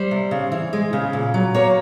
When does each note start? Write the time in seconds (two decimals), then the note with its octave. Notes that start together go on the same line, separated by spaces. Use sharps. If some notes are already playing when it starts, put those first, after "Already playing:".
Already playing: G3 C5
0.11 C3
0.31 C#3
0.52 E3
0.73 G#3
0.93 C#3
1.13 A#2
1.34 F#3
1.54 A#3 C#5